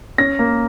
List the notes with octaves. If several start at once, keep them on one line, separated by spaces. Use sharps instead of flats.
C#4 A#6
A#3